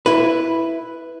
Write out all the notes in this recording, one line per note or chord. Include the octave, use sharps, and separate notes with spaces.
E4 B4